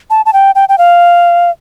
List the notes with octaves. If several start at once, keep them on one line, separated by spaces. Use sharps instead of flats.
A5
A5
G5
G5
G5
F5